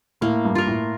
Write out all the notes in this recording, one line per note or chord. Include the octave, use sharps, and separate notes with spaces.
A2 A#3
G2
F4 A#4
A2